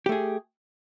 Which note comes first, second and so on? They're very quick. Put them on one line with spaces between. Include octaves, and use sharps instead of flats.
G4 A3 G#4